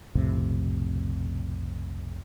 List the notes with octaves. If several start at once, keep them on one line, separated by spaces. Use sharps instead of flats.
B1 F2 A2 C3